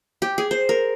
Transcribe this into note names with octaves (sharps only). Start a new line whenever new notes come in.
G4
G#4
C5
A#4